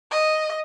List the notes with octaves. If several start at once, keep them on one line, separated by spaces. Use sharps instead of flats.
D#5